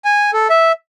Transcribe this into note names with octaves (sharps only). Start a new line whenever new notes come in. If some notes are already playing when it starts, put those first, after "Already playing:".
G#5
A4
E5